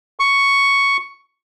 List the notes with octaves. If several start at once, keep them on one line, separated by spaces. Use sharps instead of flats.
C#6